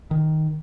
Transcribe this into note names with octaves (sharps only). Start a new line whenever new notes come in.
D#3